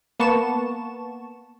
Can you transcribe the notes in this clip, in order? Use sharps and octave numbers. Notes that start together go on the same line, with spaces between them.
A#3 B3 A5 C#6 E7